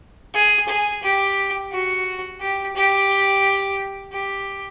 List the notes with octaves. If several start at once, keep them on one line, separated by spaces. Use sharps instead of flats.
G#4
G#4
G4
F#4
G4
G4
G4